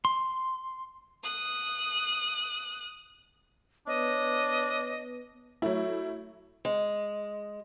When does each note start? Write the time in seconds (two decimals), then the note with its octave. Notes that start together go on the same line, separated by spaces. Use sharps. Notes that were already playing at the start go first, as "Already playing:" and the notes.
0.05 C6
1.23 D#6 F#6
3.87 B3 D4 B4 C#5 D#5 D#6
5.62 F#3 A3 E4
6.65 G#3